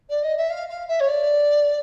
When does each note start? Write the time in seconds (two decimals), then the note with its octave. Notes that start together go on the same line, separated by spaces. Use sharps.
0.09 D5
0.23 D#5
0.36 E5
0.50 F5
0.69 F5
0.88 E5
0.99 C#5
1.08 D5